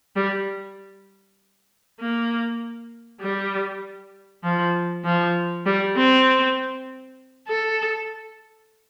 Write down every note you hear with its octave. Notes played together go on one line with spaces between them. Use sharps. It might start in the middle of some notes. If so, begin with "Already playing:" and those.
G3
A#3
G3
F3
F3
G3
C4
A4